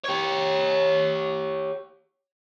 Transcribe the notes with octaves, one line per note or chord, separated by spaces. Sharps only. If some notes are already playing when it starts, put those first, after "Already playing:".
G4 C#5